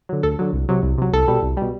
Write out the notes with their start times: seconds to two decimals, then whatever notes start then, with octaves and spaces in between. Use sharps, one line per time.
0.09 D3 F#3
0.23 D2 A4
0.39 D3 F#3
0.53 C2
0.69 C3 F#3
0.83 C2
0.98 C3 F#3
1.13 C2 A4
1.28 B2 G3
1.43 C2
1.57 B2 G3